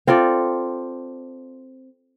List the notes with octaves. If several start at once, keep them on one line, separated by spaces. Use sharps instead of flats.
C4 F4 A4 D5